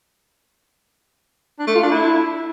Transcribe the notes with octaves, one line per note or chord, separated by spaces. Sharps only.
D4
A3
F4
D4
E4